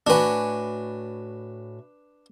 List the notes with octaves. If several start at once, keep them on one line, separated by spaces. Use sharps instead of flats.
A2 D4 F#4 B4 G#5